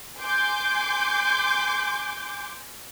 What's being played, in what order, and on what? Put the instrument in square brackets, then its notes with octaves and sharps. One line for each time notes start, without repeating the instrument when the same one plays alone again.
[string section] G#5 C6 D6 G6